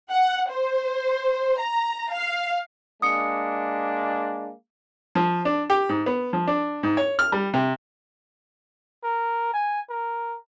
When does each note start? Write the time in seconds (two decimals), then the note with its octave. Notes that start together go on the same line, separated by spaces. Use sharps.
0.11 F#5
0.50 C5
1.60 A#5
2.12 F5
3.02 G#3 A#3 D4 D#6 C#7
5.15 F3
5.45 D4
5.70 G4
5.89 G#2
6.06 B3
6.33 F3
6.47 D4
6.83 G#2
6.97 C#5
7.19 F6
7.32 G3
7.54 C3
9.03 A#4
9.53 G#5
9.90 A#4